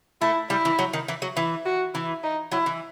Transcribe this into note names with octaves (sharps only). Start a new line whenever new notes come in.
A3 E4
G3 E4
E3
F#3
D#3
E3
F#3
E3 E4
F#4
E3 E4
D#4
F#3 E4
E3